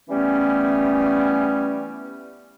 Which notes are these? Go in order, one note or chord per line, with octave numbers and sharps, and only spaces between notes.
E3 G3 A3 B3 C#4